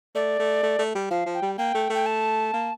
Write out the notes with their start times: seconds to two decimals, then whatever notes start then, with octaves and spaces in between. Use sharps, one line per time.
0.15 A3 D5
0.39 A3
0.63 A3
0.79 A3
0.95 G3
1.11 F3 F5
1.26 F3
1.34 G5
1.42 G3
1.58 A#3 G5
1.74 A3
1.90 A3 G5
2.06 A5
2.54 A#3